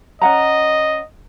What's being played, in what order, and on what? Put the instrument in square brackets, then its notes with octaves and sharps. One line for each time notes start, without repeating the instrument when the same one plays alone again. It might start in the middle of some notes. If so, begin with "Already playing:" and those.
[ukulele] C#4 F#5 A#5 [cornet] D#5